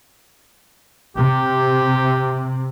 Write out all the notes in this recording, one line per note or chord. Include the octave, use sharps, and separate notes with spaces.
C3 G4